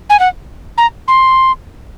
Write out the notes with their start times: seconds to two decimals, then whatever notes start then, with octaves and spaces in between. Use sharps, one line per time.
0.10 G#5
0.19 F#5
0.78 A#5
1.08 C6